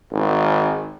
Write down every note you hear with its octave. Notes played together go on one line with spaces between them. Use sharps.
G#1